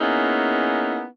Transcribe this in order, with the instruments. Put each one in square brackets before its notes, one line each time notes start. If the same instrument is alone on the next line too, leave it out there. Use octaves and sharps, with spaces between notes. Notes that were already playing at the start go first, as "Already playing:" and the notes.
[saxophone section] A#3 B3 C#4 D#4 E4 G#4